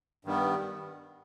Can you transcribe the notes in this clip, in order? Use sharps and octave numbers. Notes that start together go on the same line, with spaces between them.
G2 D#3 G3 B3